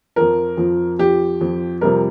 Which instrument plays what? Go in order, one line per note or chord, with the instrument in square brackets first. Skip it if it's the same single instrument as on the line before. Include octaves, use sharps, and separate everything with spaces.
[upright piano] F2 F3 A#4
F2 F3
F2 F3 G4
F2 F3
F2 C3 G3 A#4